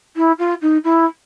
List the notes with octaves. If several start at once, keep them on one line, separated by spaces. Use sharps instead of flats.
E4
F4
D#4
E4